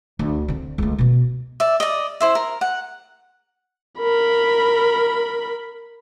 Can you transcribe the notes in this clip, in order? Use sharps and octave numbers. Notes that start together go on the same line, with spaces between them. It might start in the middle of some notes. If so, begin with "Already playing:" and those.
D2
D3 C4
C#2 A3
B2 B3
D5 E5
D5 D#5
E4 C5 E5
A#4
F#5
A#4 B5